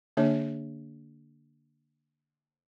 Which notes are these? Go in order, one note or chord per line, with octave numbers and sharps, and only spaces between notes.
D3 A#3 D4 C#5